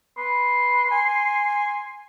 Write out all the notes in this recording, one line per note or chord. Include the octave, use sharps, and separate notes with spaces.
B4 C6
G#5